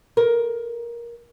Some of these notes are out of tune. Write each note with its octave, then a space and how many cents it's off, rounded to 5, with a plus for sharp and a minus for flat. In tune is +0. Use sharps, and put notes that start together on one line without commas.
A#4 +15